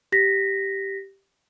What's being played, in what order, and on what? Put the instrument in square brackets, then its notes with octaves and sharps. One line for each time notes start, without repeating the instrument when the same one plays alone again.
[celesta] G4 A#6 B6